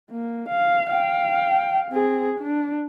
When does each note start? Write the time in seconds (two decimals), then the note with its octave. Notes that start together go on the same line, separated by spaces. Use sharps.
0.11 A#3
0.49 F5
0.90 F5 G5
1.91 C4 G#4
2.39 D4